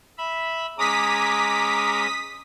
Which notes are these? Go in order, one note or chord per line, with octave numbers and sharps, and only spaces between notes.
E5 B5
G#3 C#4 A#5 D6 D#6 B6